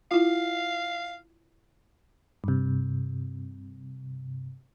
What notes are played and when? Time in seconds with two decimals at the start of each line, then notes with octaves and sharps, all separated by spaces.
0.11 E4 F4 F5
2.44 G2 C3